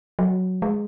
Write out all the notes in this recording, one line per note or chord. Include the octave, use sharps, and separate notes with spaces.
F#3
G#3